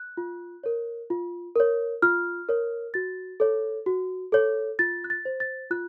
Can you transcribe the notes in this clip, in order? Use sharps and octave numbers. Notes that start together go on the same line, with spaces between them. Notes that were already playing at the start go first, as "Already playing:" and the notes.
Already playing: F#6
F4
A#4 C#5
F4
A#4 C#5
F4 F6
A#4 C#5
F#4 A6
A4 C#5
F#4
A4 C#5
F4 A6
F#6
A6
C5
A6
F4 F#6